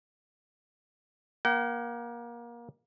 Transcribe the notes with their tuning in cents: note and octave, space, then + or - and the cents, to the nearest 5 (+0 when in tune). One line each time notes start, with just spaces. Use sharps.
A#3 +25 G5 -45